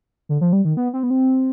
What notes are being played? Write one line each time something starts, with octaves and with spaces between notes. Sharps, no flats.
D3
F3
G3
D#3
B3
C4
B3
C4